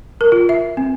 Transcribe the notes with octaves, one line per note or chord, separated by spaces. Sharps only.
A#4
F4
E5
C4